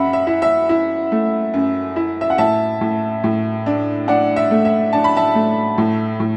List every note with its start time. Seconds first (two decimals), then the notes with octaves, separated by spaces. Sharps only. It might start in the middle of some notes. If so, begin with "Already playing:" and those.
Already playing: F#2 E5 F#5 B5
0.13 E5
0.27 E4
0.42 E5
0.69 E4
1.12 A3
1.54 F#2
1.96 E4
2.21 E5
2.30 F#5
2.38 A2 E5 A5
2.81 A2
3.24 A2
3.66 D4
4.08 D4 D5 F#5
4.36 E5
4.51 A3
4.65 E5
4.93 D4 A5
5.04 B5
5.17 E5 A5
5.35 A3
5.78 A2
6.20 A2